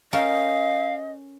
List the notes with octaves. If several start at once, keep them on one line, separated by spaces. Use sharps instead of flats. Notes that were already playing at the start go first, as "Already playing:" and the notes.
C#4 A4 A#4 D#5 F5